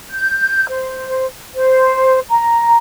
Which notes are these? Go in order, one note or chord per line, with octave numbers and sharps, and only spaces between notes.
G6
C5
C5
A#5